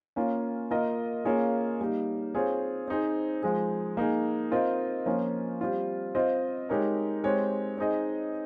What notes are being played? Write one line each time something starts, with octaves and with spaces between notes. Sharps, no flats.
A#3 C#4 F4
A#3 F4 A#4 D#5
A#3 C#4 F4 G#4 C#5
G3 A#3 D#4
C4 F4 G#4 C#5
C4 D#4 G#4 C5
F3 G#3 D#4 G#4
A#3 D#4 G#4
C4 F4 A#4 D#5
F3 A#3 C#4 F4
G3 C4 F4
C4 F4 C5 D#5
G#3 D#4 G4 A#4 C#5
G#3 C4 G4 C#5
C4 D#4 G#4 D#5